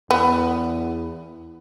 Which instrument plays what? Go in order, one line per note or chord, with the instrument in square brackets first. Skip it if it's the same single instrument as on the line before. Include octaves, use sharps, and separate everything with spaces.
[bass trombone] E2 [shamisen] B3